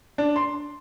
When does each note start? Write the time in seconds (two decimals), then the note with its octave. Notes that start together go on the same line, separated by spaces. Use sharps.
0.18 D4
0.36 C6